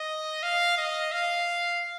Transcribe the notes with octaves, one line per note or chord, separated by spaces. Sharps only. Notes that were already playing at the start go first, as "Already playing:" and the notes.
Already playing: D#5
F5
D#5
F5